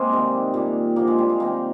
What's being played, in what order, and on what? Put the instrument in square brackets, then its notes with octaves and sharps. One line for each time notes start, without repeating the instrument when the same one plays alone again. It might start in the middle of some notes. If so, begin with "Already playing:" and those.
Already playing: [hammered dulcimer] G#3 A#3 C4
C3 D#3 G3
A#2 G3
G2 D3 F3 A#3
G#3
G3
G#3
C3 D#3 G3 A#3